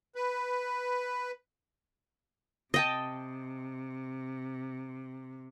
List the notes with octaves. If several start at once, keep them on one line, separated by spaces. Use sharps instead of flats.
B4
C3 D#5 G5 A5